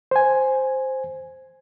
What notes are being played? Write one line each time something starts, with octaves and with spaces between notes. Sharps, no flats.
C5 G#5